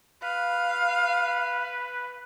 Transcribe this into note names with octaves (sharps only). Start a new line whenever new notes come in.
B4 F5